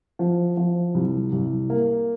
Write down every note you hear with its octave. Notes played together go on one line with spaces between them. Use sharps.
F3
F3
C2
C2
A#3